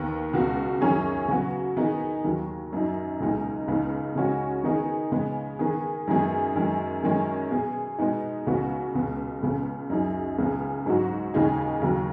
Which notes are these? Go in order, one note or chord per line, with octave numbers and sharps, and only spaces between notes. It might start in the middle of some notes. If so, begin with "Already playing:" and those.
Already playing: D#2 D#3 B3
C#2 B2 B3 F#4
F#2 D#3 F#3 C#4 G#4
C#3 F#3 B3 F#4
D#3 B3 D#4 G#4
D#2 D#3 F#3
F#2 F#3 D#4
C#2 B2 G#3 D#4
C#2 C#3 B3 D#4
C#3 G#3 C#4 F#4
D#3 B3 D#4 G#4
C#3 G#3 B3
D#3 B3 G#4
F#2 D#3 G#3 B3 G#4
F#2 D#3 G#3
F#2 D#3 G#3 C#4
B2 B3 G#4
B2 G#3 B3 D#4
C#2 C#3 B3 F#4
C#2 B2 B3
C#2 C#3 B3
F#2 F#3 D#4 G#4
C#2 C#3 B3 G#4
G#2 F#3 D#4 F#4
D#2 C#3 G#3 D#4 G#4
D#2 C#3 F#3